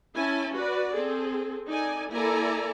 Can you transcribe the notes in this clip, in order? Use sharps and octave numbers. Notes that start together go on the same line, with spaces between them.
C#4 E4 G#5 A5
F#4 B4 D5
C4 G#4 A4
D#4 A4 D5 G#5
A#3 E4 A4 D5 G#5 A#5